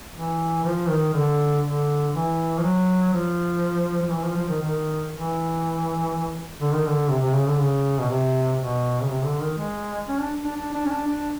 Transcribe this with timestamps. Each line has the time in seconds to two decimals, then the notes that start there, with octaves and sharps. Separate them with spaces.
0.15 E3
0.64 F3
0.89 D#3
1.13 D3
1.64 D3
2.14 E3
2.58 F3
2.63 F#3
3.13 F3
4.02 F3
4.12 E3
4.24 F3
4.37 F3
4.49 D#3
4.62 D#3
5.11 E3
6.60 D3
6.74 D#3
6.87 D3
7.10 C3
7.22 C3
7.34 C#3
7.47 D3
7.60 C#3
8.00 B2
8.09 C3
8.59 B2
9.02 C#3
9.08 C3
9.25 D3
9.41 D#3
9.57 G#3
10.07 C#4
10.20 D4
10.44 D4
10.57 D4
10.74 D4
10.86 C#4
10.90 D4
11.07 D4